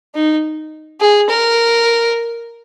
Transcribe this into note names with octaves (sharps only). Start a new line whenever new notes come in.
D#4
G#4
A#4